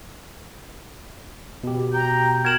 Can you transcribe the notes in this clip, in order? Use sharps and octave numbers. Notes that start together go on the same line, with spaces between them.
B2 G4
G5 A#5
F#4 A#4 G#6 E7 F#7